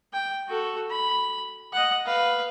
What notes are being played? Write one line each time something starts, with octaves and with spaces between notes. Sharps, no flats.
G5
F#4 A4
B5
D#5 F#5
B4 F5